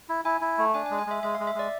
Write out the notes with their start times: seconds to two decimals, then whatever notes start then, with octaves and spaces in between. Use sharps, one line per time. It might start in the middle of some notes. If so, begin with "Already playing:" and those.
0.09 E4
0.25 E4 G#5
0.41 E4
0.58 A3
0.74 D4 G#5
0.86 G#5
0.91 G#3
0.99 G#5
1.07 G#3 E5
1.23 G#3 E5
1.35 F5
1.40 G#3
1.47 E5
1.55 G#3 D5